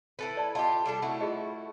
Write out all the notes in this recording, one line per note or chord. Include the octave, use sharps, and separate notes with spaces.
E4 A4 B4
D5 A5
F4 G4 D#5 A5
G3 D4 A4
A3 E4 F#4
F4 G#4 D#5